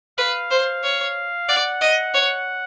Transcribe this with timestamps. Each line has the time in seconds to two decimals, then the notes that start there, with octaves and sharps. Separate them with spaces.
0.18 B4 F5
0.51 C5
0.83 C#5
1.48 D5 F#5
1.81 D#5
2.14 C#5